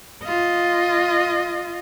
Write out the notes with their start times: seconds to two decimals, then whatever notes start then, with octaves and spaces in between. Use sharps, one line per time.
0.24 F4 D#5